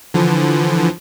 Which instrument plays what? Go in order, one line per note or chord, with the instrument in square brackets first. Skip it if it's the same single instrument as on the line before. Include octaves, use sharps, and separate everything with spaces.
[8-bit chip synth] D3 E3 F3